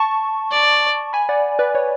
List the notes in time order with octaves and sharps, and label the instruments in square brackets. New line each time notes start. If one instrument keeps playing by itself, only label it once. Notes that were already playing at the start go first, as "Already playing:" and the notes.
Already playing: [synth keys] A5 C#6
[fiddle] D5
[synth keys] G#5 B5
D5 F#5
B4 D5
C#5